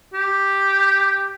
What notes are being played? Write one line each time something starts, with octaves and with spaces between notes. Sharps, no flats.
G4